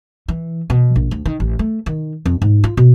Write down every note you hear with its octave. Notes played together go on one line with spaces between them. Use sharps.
E3
B2
A#1
D2
D#3
A1
A3
D#3
F2
G#2
F4
B2